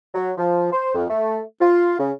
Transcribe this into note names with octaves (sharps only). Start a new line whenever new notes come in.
F#3
F3
C5
F2
A3
F4
C#3